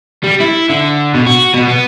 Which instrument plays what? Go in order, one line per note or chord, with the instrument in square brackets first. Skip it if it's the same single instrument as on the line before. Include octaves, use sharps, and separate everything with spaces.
[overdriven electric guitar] G3
E4
D3
B2
F#4
B2
B3